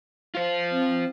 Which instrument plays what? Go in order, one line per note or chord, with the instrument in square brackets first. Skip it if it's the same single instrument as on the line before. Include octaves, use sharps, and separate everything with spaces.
[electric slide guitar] F4 C5
[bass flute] C4